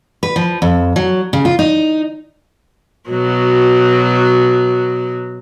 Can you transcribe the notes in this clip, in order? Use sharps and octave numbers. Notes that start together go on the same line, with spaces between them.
B4
F3
F2
F#3
C#3
F4
D#4
B2 F#3